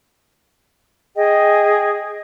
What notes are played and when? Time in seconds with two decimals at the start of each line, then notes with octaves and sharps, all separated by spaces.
1.16 G#4 D#5 G5